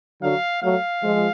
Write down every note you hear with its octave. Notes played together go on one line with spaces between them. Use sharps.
D3 F#3 F5
F#3 A3 F5
F3 G#3